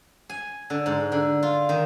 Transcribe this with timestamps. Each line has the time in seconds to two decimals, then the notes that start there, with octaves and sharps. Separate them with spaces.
0.29 G#5
0.70 D3
0.86 G#2
1.12 D3
1.43 F4
1.69 D#3